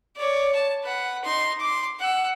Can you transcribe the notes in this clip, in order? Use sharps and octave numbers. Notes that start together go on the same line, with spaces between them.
C#5 D5
A5
B4 F#5
D#4 C6
C6 D6
F#5 E6